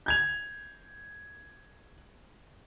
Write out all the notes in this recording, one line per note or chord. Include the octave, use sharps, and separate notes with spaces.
G6 G#6 F7